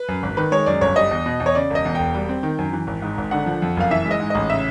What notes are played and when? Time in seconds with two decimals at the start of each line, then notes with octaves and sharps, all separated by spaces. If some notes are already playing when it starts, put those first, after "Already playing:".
Already playing: B4
0.08 F#2
0.23 G#1
0.37 D#3 B4
0.51 G#3 C#5
0.66 F#2 D5
0.81 G1 C#5
0.96 G3 D#5
1.11 E2
1.26 B2
1.40 E2
1.46 C#5
1.55 C#3 D5
1.70 E1 D#5
1.85 E2
1.95 E1 G5
2.14 G3
2.29 C4
2.43 D#3
2.58 F#2
2.73 E3
2.87 G#1
3.02 G#2
3.18 G#1
3.31 D3 F#5
3.46 F3
3.62 F2
3.77 F#1 F5
3.91 E3 E5
4.06 G#3
4.11 D#5
4.20 G#2
4.30 A1 D#5
4.50 C#3 E5